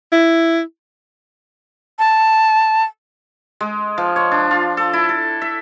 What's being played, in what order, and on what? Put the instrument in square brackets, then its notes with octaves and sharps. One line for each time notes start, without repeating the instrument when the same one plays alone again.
[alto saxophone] E4
[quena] A5
[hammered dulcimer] G#3
F3
C#5
D4
F4
A4
E4
A4
E5